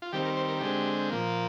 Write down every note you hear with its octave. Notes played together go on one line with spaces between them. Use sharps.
F4
D#3 G3 C4 G4
A#4
C5
A#4
D3 G#3 C4 G4
A#2 F3 A#3